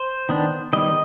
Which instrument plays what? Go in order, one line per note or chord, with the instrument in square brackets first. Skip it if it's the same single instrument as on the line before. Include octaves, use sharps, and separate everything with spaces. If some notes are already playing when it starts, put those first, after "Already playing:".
Already playing: [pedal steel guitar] C5
D#3 B3 D4
D#3 G3 B3 D#5